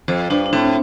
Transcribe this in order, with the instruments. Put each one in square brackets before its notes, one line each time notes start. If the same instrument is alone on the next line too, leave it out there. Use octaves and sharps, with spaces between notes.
[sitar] F2 [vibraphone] C5
[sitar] G2 [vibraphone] D4
[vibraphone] D4
[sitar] A2 [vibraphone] C4